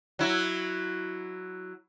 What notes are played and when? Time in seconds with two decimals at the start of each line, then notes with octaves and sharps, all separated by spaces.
0.19 F#3 E4